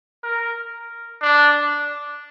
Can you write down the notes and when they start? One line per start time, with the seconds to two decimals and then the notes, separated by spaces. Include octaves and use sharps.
0.24 A#4
1.22 D4